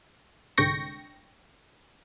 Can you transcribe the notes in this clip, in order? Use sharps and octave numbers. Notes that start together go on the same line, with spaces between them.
C2 G#2 D3 G5 C#6 A#6